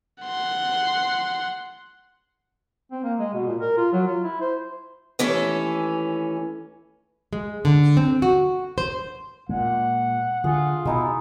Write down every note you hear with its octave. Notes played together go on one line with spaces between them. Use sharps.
F#5 C6
C4
A#3
G#3
B2
A#2
A#4
F4
F#3
F4
E4
C5
D#2 E3 A3 C#4
G#3
D3
C4
F#4
C5
A#2 G#3 F#5
D3 F4 G#4
B2 G#3 D#4 E4